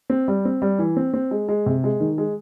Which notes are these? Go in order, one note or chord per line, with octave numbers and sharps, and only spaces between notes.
C4
G3
C4
G3
E3
C4
C4
G#3
G#3
C3
G#3
D#3
G#3